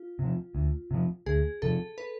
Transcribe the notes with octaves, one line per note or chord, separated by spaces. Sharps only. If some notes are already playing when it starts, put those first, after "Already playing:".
Already playing: F4
C3 F3
D2
C3 F3
D2 G#4
C3 F3 A4
B4